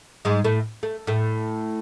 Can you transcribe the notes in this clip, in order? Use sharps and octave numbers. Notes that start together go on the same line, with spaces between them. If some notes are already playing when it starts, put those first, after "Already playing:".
G#2 G#3
A2 A3
A3
A2 A3